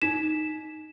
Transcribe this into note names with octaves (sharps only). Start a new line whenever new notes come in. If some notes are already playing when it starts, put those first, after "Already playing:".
D#4 B6 E7